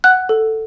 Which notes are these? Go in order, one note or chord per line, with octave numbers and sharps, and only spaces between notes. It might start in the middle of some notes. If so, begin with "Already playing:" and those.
F#5 F#6
A4